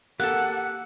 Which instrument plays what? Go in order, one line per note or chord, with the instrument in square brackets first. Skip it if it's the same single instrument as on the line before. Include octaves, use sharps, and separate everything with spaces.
[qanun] A#3 A4 [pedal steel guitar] G4 F#6 [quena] F#5